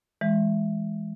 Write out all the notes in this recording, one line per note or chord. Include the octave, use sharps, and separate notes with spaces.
E3 G#3